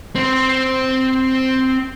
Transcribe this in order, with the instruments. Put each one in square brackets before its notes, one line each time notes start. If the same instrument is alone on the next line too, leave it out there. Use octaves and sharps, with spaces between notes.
[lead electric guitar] C4 C5